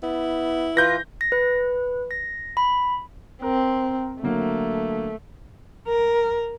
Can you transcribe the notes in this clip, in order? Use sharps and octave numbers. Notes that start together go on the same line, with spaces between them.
B3 E4
E3 F4 B4 G6 A#6
A#6
B4
A#6
B5
C4 A#4
D3 F#3 A3 A#3
A#4